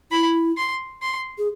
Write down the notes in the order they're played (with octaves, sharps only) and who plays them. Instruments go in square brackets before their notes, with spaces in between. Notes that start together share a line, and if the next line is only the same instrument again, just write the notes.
[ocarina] E4 [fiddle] B5
[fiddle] C6
C6
[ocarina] G#4